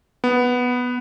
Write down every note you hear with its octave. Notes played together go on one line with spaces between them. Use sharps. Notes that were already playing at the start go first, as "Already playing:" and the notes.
B3